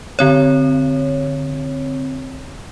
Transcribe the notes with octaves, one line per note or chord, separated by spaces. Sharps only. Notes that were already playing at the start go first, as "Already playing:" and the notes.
D3 C4 C#5